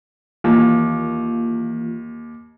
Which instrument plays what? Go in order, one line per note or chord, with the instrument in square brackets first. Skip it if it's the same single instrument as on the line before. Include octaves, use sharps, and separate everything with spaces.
[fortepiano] D#2 [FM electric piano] E3 A#3 F4